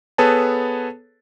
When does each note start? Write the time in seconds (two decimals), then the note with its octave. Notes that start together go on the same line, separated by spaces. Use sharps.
0.18 B3 G#4 A4 B4 C#5 A5